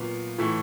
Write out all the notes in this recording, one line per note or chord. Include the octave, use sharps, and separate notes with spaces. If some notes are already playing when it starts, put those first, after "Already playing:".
Already playing: A#2 F#3 B3 F5
A2 E3 A3